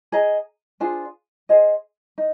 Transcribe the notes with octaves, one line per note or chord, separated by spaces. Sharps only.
G#4 D#5 A#5
D4 F4 G#4 C5
G#4 C5 D#5
D#4